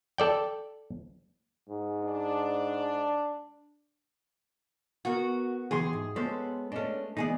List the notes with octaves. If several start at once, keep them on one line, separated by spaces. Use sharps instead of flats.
A4 D5 G5
G#2
D4
B3 F#4 A#4
B1 E2 E3 G4 G#4 C6
G#2
G#3 B3 C#4 A4 C5
G#3 A3 C#4 D4
E3 G#3 B3 D#4 G#4 D5